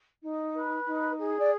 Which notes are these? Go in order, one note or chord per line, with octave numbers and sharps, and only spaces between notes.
D#4
B4
D#4
G#4
D5